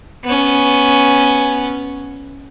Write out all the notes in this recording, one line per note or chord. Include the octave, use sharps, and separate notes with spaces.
B3 C#4